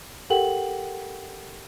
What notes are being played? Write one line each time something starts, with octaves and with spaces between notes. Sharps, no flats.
G4 A4 A#4 F#5 G5 F#7